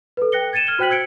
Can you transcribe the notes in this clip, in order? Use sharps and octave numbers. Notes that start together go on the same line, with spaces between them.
A4 B4
G5 F#6 A#6 C#7 G7
G#6 A6 C#7 D#7 E7
F6 G#6 G7
F#4 C5 G5 F#6 B6 F#7
E6 G#6 C#7 D7